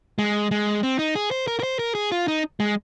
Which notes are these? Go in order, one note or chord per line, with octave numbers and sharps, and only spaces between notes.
G#3
G#3
C4
D#4
G#4
C5
A#4
A#4
C5
A#4
G#4
F4
D#4
G#3